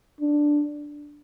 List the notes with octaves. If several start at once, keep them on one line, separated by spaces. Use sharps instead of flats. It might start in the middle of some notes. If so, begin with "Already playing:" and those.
D4